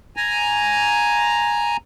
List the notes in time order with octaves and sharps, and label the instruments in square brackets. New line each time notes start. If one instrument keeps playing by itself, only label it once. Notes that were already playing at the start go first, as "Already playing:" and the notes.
[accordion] G#5 A#5